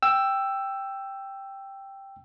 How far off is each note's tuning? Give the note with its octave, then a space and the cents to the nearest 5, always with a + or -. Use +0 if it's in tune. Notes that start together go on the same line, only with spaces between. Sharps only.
G5 +0 E6 +10